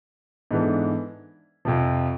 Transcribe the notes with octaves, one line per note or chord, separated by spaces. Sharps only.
G#2 E3 B3 D4 A4
F2 C3 F3